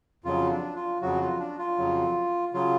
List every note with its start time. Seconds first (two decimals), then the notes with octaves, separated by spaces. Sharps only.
0.24 F2 C#3 F#3 F4
0.51 D4
0.75 F4
1.01 F2 C#3 F#3 F#4
1.21 F4
1.39 D4
1.59 F4
1.78 F2 C#3 F#3
2.54 C#3 F#3 F4